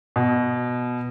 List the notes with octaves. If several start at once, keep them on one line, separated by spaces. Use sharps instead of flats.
B2